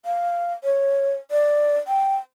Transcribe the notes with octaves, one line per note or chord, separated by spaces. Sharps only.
F5
C#5
D5
G5